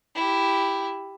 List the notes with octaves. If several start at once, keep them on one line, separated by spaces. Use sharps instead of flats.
E4 G4